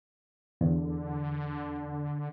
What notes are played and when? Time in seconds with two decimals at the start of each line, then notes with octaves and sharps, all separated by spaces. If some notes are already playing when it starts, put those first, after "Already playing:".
0.61 E2 D3